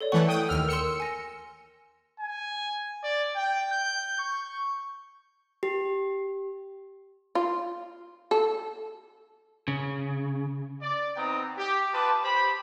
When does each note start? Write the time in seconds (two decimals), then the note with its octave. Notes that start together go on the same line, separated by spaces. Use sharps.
0.01 A4 C#5 D5
0.12 E3 A3 F#5 C#6
0.28 G5 D#6
0.49 D#2 E6 F6
0.68 A#4 C6 E6 C#7
1.00 G#5 A#6
2.20 G#5
3.03 D5
3.36 G5
3.72 G6
4.19 C#6
5.63 G4
7.35 F4
8.31 A4
9.68 C#3
10.82 D5
11.16 B3 C4 D#4 G5 A#5 D#6
11.57 G4
11.93 F4 G4 B4 A5 D6 D#6
12.24 G4 C5 B5